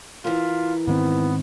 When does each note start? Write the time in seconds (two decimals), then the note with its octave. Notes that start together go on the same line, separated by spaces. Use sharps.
0.25 E3 F4 A#4
0.87 G#2 D#3 B3 C4